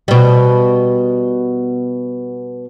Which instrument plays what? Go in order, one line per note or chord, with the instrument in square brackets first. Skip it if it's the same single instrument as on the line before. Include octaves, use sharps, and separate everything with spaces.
[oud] B2 G3